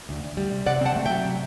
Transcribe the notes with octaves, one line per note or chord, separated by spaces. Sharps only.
D2
D2
G3
C3
C3 D5 F#5
C4 F#5 A5
A3
F#3 E5 G5
C3